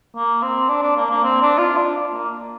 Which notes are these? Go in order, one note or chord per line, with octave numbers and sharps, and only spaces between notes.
A#3
C4
D4
D4
A#3
A#3
C4
D4
F4
D4
A#3